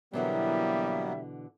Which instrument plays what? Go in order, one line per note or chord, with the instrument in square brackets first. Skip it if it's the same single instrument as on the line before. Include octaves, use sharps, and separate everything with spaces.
[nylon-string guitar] B2 D3 E3 [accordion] F#3 A#3 B3 [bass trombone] G3 [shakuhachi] E5